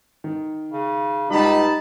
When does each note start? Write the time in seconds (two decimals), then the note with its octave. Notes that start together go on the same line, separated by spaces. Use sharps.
0.24 D#3
0.72 C#3
1.30 C#2 G3 D#4 A5 B5